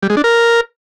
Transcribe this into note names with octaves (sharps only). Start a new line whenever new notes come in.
G3
G#3
D4
A#4